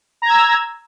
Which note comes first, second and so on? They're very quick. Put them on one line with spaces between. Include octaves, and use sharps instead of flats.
A#5 G#6 E6